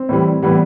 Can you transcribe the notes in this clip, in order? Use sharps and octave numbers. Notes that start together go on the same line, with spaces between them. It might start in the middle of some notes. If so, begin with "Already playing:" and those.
Already playing: C4
A2 E3 G3
A2 E3 G3 B3